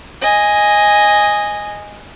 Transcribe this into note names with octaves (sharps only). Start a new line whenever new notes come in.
D#5 G#5